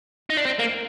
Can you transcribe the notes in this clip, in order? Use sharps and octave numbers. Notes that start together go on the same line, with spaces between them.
D#4
D4
C4
A#3